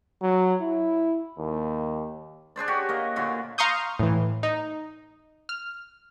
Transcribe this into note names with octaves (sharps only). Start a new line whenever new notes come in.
F#3
E4
D#2
D4 G#4 C5 D5
F#4 G4 C#5
A#3 D#5
A#2 D3 F#4
F5 A#5 C6 C#6 D#6 G6
A2 E3
D#4
F6